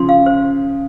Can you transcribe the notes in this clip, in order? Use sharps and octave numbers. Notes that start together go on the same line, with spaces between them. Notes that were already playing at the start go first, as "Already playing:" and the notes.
Already playing: C#3 F3 C6
F5
C5